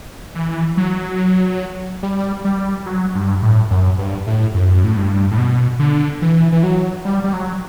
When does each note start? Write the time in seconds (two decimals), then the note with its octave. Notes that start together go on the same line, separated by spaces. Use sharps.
0.35 E3
0.77 F#3
2.03 G3
2.45 G3
2.86 F#3
3.15 G2
3.42 A2
3.71 F#2
3.98 G2
4.27 A2
4.54 F#2
4.84 A2
4.97 G2
5.31 A2
5.38 B2
5.79 D3
6.22 E3
6.52 E3
6.63 F#3
7.05 G3
7.24 G3
7.33 F#3